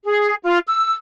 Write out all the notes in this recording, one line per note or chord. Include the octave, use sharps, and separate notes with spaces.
G#4
F4
E6